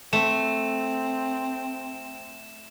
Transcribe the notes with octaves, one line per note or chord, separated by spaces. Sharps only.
A3 C4 E7